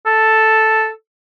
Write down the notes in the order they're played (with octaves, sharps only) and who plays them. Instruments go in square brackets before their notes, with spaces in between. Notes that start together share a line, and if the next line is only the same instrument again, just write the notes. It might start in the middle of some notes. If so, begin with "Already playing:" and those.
[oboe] A4